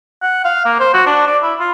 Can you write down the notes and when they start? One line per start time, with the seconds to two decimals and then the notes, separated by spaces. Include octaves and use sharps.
0.22 F#5
0.45 F5
0.65 A#3
0.80 C5
0.94 F#4
1.06 D4
1.27 D5
1.43 E4
1.60 F4